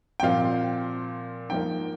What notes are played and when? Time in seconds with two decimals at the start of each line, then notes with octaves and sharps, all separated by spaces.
0.20 G5
0.23 A#2 F3 C4 F5
1.49 G#2 F3 A#3 G5